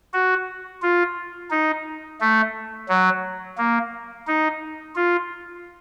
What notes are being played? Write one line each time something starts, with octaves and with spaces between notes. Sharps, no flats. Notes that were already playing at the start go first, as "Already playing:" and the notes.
F#4
F4
D#4
A3
F#3
A#3
D#4
F4